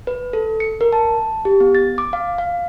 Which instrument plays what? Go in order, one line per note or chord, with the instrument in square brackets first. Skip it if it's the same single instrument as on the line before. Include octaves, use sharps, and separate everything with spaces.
[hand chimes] B4
A4
C#7
A#4
A5
G4
B3
A6
D6
F5
F5